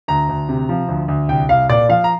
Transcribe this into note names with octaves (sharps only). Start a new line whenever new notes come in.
D2 A#5
D2
C3
F3
D2
D2
C2 G5
C2 F5
A#2 D5
F3 F5
A#5